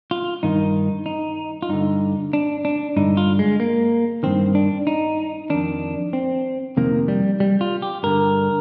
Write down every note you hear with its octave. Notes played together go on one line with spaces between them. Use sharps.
F4
G2 D#3 D#4
D#4
F4
G2 D3 D#4
D4
D4
G2 D3 D#4
F4
G#3
A#3
G2 D#3 C4
D4
D#4
F2 D#3 D4
C4
F2 C3 D#3 A#3
G3
G3
F4
G4
G2 D3 A#4